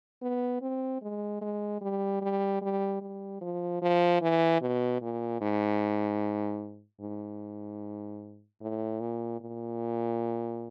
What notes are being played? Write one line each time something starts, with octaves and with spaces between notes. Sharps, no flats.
B3
C4
G#3
G#3
G3
G3
G3
G3
F3
F3
E3
B2
A#2
G#2
G#2
A2
A#2
A#2